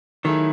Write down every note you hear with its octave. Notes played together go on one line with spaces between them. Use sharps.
D#3 F#3 A3 E4 G#4